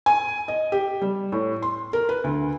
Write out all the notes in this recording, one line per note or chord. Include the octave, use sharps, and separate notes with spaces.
G#5
D#5
G4
G3
A2
C6
A#4
B4
D2